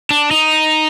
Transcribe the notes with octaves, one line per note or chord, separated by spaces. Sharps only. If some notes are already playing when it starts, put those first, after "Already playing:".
D4
D#4